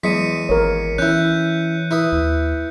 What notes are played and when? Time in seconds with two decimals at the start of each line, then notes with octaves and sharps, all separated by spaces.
0.04 E2 F#3 G#3 B6 C#7 D#7
0.49 G#1 A#4 C#5
0.98 E3 C#4 E4 F#6 G6
1.91 E4 B4 D#6
2.12 D#2